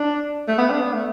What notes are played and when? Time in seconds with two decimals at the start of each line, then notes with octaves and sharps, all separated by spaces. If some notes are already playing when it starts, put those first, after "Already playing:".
Already playing: D4
0.48 A3
0.58 B3
0.70 D4
0.81 B3
0.93 A3